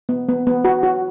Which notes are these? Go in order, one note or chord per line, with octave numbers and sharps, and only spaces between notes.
B3
B3
B3
F#4
F#4